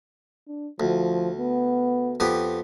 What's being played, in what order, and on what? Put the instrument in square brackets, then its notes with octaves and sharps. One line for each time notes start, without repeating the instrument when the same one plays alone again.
[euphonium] D4
[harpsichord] D2 [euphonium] F3
[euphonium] B3
[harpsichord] F2 B3 G4